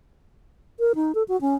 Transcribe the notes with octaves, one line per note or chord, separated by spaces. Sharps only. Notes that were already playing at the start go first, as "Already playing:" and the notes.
A#4
D#4
A4
F#4
C#4